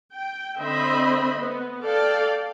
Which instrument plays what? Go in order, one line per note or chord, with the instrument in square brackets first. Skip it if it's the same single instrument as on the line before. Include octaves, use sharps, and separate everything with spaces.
[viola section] G5
D3 C4 C5 D#5 E5 B5
B3
A4 D5 F5 G5